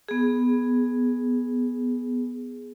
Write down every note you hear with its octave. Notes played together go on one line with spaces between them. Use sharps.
B3 G#4